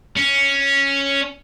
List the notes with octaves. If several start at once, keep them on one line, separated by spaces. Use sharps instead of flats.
C#4